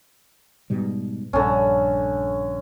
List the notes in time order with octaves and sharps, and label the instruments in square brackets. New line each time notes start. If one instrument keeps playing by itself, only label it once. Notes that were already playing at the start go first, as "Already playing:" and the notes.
[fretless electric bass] G#2 B2 G3
[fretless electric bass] A#1 G2 [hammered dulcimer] D3 C#4